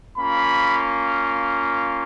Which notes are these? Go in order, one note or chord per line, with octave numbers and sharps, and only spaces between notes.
A#3 C#4 F4 B5